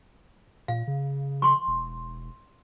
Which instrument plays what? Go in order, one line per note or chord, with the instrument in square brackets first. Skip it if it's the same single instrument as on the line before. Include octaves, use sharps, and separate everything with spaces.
[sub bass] A#2 [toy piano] F5
[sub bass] C#3
[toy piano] C6 C#6
[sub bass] E1